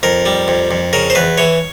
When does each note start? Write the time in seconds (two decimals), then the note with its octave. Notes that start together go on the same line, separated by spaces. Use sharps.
0.03 F2 A#4
0.26 G3
0.48 F2
0.71 F2
0.93 C#3 A#4
1.10 C5
1.15 E2 B4
1.38 E3 C#5